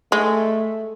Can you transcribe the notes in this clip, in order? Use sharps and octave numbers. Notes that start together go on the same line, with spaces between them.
G#3 A3